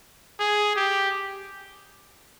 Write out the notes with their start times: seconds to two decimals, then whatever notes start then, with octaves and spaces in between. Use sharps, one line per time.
0.39 G#4
0.76 G4